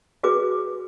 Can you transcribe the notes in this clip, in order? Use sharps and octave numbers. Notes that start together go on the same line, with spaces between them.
F#4 G#4 B4 D6